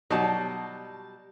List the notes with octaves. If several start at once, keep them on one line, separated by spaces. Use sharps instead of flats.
B2 F#3 G3 D#4 F#4 A5